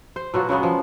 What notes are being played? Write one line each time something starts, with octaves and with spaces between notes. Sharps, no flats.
C5
B2 F#3 F4 F#4
C#3 F#3 G#3 B3
F3